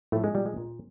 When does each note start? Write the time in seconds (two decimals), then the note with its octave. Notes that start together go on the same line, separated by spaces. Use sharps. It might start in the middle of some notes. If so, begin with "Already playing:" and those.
0.12 A2 F3 A3
0.24 G#3
0.34 A#2 G3
0.46 G#3
0.57 A#2